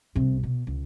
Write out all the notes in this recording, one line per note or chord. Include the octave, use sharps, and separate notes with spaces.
C2 C3
B2
C#2